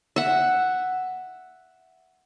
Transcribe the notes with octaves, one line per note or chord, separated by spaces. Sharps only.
E5 F#5